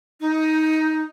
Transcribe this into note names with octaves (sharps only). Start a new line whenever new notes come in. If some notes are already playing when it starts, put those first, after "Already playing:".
D#4